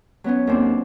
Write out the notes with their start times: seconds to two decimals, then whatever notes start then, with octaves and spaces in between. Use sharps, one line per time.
0.24 F#3 B3 C#4
0.47 D#2 C4 D4